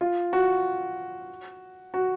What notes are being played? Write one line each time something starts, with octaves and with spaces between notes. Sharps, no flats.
F4
F#4
F#4